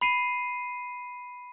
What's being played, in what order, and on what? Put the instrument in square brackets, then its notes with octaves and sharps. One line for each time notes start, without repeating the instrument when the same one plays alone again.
[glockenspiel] B5 C7 D#7